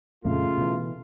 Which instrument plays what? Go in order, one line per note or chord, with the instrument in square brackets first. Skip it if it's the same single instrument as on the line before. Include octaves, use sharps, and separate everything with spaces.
[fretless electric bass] F2 A#2 G#3 [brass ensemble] C#3 A3 F4
[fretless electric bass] B2 E3